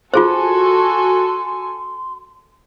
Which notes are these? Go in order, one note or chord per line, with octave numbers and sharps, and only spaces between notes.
F4 F#4 G#4 A4 C5 G#5 C6